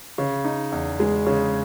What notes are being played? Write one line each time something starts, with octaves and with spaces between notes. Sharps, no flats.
C#3
D#4
E2
G#3
C#3